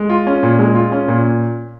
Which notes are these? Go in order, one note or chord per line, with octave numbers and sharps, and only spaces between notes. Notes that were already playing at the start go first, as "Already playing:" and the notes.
Already playing: G#3
F4
C#4
A#2
G#3
F4
C#4
A#2